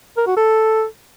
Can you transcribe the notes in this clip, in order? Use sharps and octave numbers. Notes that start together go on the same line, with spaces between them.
A#4
F#4
A4